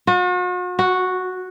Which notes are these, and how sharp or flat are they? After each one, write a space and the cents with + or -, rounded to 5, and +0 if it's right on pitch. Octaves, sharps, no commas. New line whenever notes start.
F#4 -45
F#4 -5